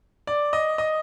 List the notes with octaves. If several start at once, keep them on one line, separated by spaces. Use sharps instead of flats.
D5
D#5
D#5